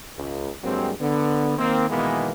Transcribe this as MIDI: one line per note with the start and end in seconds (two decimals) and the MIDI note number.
0.17 0.50 37
0.64 0.92 43
0.64 0.92 54
0.64 0.92 56
0.64 0.92 58
0.64 0.92 60
1.00 1.58 50
1.00 1.58 59
1.58 1.87 51
1.58 1.87 58
1.58 1.87 60
1.89 2.32 47
1.89 2.32 51
1.89 2.32 52
1.89 2.32 56
1.89 2.32 58
1.89 2.32 59